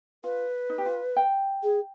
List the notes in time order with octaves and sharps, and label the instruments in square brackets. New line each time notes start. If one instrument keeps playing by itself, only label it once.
[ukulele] F4 [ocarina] B4
[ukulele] D#4
G4
F4
G5
[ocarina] G#4